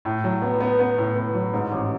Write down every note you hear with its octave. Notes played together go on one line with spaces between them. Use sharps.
A2
F#3
B3
B3
B3
A2
B3
F#3
G#2
A1